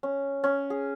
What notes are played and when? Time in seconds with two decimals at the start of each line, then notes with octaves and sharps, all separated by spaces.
0.03 C#4
0.44 C#4
0.70 G#4